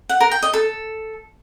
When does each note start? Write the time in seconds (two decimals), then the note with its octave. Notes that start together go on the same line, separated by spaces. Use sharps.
0.09 F#5
0.20 A#4
0.31 G5
0.43 D#5
0.54 A4